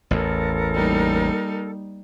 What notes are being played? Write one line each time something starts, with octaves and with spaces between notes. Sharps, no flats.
A1 E2 A4 A#4
G3 A#3 D#4